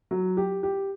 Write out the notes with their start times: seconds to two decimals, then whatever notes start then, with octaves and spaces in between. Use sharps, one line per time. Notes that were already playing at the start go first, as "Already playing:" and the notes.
0.11 F#3
0.37 G4
0.63 G4